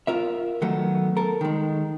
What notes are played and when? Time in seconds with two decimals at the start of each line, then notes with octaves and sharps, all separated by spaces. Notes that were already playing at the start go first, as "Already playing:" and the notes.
0.07 F4 A#4 E5
0.62 D#3 F#3 A3 B3
1.17 A4 A#4
1.41 D#3 G#3